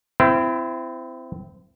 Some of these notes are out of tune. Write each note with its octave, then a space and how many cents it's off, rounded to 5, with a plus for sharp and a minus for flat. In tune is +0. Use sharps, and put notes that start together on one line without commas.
C4 -20 E4 +25